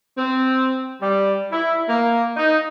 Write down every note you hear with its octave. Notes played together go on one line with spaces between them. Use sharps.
C4
G3
E4
A#3
D#4